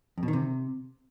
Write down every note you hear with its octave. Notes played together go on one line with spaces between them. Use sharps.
F2
B2
D#3
C3